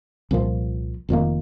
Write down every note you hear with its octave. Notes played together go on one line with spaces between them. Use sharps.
C2 A#2 F3
F1 F2 D#3 A#3